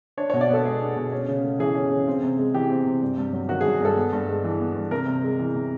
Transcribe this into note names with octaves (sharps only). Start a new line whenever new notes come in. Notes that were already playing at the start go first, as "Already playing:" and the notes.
D4 C#5
B2 C#5
D5
B3 A4
G#3 G#4
D4
B2
C#4
C#3
A3
E3 G#4
C#4
C#3
C4
C3
G#3
E3 G4
C4
C3
G2
G2
F#3
D#3 F#4
G2 G#4
G2 A4
B3
G2
G#3
E3
B3
G2
C3 A#4
C3
G#3
E3
C3